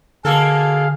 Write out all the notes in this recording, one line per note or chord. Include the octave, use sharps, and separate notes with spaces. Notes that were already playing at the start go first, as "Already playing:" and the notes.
B2 D3 A#3 G#4 A4 F5